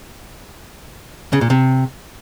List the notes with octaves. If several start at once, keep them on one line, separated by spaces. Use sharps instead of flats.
C#3
A#2
C3